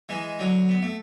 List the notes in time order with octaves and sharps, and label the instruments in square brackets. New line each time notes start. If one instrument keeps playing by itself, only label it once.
[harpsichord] E3 G#3
D3 F#3
B3
A3